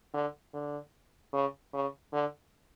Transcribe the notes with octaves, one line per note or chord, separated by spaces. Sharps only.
D3
D3
C#3
C#3
D3